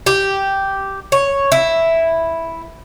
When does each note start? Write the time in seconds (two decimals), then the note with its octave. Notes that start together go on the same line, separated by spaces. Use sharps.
0.06 G4
1.12 C#5
1.52 E4